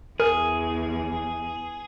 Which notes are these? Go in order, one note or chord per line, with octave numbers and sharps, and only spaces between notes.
E2 G#4 A#4